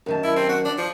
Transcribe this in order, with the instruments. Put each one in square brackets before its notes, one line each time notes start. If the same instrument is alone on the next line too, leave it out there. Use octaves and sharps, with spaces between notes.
[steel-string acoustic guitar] F#2 D#3 A5
[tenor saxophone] E4
C4
F#4
D4
F3